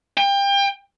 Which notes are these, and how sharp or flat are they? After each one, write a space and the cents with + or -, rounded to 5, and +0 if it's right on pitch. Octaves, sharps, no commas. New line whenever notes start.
G5 +30